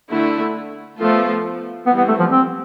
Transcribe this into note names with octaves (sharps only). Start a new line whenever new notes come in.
D3 A3 E4
F3 A3 B3 F4 A4
E3 G3 B3 C4
B3
A3
F3
C4